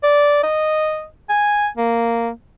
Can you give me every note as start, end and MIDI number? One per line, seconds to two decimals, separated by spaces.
0.03 0.39 74
0.43 1.06 75
1.29 1.68 80
1.78 2.30 58